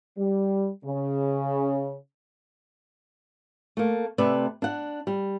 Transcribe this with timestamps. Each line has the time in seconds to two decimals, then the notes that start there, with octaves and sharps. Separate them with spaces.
0.18 G3
0.85 C#3
3.77 A3 A#3
4.18 C3 A3 B4 D5
4.62 D4 F#5
5.07 G3